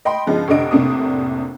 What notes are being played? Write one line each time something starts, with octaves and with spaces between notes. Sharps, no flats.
D#5 G5 B5 C6
G2 C#3 F3 G#3 B3 D#4
F1 D3 D4 D#5 D7
F1 A2 C3 A#3 D4 D#6